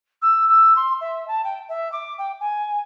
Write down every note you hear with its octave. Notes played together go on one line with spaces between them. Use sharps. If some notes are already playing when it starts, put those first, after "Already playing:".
E6
E6
C6
E5
A5
G5
E5
D6
G5
G#5